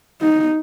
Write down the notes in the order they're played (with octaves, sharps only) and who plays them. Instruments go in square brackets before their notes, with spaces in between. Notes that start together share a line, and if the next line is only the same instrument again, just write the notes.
[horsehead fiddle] D#4